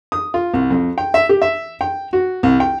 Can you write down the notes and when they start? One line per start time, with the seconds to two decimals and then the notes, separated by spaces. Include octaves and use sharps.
0.12 D#6
0.34 F4
0.54 C2
0.70 F2
0.98 G5
1.14 E5
1.29 G4
1.42 E5
1.81 G5
2.13 F#4
2.43 C2
2.60 G5